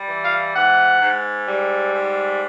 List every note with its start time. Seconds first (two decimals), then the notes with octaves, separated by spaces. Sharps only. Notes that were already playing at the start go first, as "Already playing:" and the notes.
Already playing: G3
0.09 E3
0.24 F5
0.55 G#2 F#5
1.01 G#2
1.47 G3
1.94 G#2